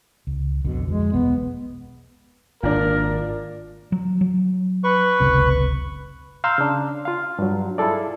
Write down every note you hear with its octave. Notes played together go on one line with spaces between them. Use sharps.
C#2
B1 F2 B2 D3
F2 E3 G#3
E1 B1 B3
G#1 A#2 A#3 D4 A#4
F#3
F#3
B4 C#6
F#1 C#2 C3
F5 A#5 C6 E6 F6 G6
C#3 D4
F4 F5
G2 F#3
E4 F4 G#4 A4 D5